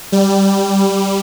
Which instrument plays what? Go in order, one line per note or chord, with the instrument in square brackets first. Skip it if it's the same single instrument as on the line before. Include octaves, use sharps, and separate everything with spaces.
[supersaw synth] G3